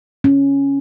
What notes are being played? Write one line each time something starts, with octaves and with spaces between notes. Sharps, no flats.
C#4